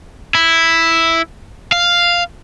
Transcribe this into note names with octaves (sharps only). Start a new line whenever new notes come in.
E4
F5